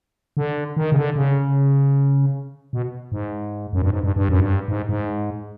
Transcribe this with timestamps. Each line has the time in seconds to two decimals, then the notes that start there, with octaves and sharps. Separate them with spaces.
0.37 D3
0.77 D#3
0.92 C#3
0.96 D3
1.16 C#3
2.73 B2
3.12 G#2
3.73 F#2
3.82 G2
3.90 G#2
4.03 G2
4.16 G2
4.29 F#2
4.40 G2
4.68 G#2
4.89 G#2